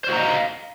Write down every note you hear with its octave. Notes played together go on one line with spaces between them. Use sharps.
F#4 C5 D#5 F5 A#5